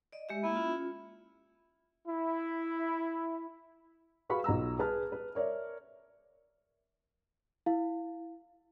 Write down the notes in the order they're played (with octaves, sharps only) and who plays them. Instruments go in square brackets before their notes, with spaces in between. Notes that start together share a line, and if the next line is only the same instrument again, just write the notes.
[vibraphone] D5 D#5
G#3 G4 E5
[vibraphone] A#3 [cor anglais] E4
[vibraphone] C#4 F4
[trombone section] E4
[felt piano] F#4 G#4 B4 F5 B5 C#6
B1 F4 A#5 E6
G#4 B4 A5 F6
B4
A#4 C#5 D5 E5
[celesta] E4 F5